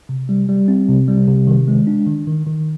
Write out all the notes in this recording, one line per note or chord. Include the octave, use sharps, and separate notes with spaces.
C3
G3
G3
C4
C3
G3
C3
D#3
G#3
D4
D#3
D#3
D#3